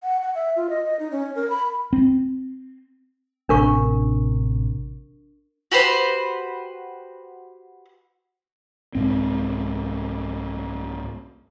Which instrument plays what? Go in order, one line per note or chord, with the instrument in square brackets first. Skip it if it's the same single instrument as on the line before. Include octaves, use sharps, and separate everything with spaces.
[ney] F#5
F#5
E5
F4
D#5
D#5
D#4
C#4
A#4
B5
[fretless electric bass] C4
[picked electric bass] A1 C3 [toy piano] D4 A#4 C#6
[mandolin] F#4 G4 B4 C5
[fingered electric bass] C2 G#2 C4